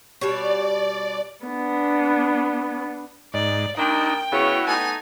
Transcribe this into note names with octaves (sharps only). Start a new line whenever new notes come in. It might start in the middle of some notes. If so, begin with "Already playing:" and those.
B2 G3 C#5 D5
B3 D4
G#2 D#4 D5
D#2 D4 D#4 A#4 G5
C#3 B3 C#4 E4 F#4 C#5
A3 B3 D#4 G#5